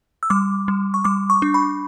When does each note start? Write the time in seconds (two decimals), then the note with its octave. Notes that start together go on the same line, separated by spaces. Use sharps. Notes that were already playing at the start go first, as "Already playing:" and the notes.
0.23 E6
0.30 G3 D6
0.68 G3
0.94 C#6
1.04 G3 D6
1.30 C#6
1.42 D4
1.54 B5